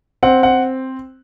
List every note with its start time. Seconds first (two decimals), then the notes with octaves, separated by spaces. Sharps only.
0.23 C4 F#5
0.43 F#5